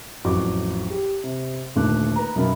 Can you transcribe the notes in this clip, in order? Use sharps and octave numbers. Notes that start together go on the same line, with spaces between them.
A1 F2 F#3 F#4 C#6 D6
G4
C3
D#1 D3 D#3 A3 D6 F#6
B4 A#5
B1 F#2 B3 A#4 B5